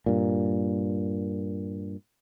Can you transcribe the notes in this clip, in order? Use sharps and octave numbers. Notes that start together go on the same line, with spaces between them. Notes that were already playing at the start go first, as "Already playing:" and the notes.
G2 A#2